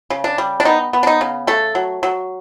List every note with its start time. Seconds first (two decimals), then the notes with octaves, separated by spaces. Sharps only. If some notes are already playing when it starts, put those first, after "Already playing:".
0.10 C#3
0.24 D4
0.38 G3
0.60 D4
0.65 B3 D#4
0.93 B3
1.03 D4
1.07 D#4
1.21 C#3
1.47 A3 A4
1.75 F#3
2.03 F#3